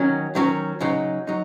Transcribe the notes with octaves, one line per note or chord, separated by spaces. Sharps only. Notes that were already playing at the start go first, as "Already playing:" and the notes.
Already playing: D#3 F#3 C#4
D#3 F#3 C#4
C#3 F#3 D#4
F#3 D#4